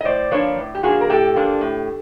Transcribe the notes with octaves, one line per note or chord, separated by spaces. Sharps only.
D#5
A2 C5 D5
F3 A#3 D4 B4 C#5
A2
G4
F3 A#3 D4 F#4 G#4
A#4
A2 G4 A4
F3 A#3 D4
A2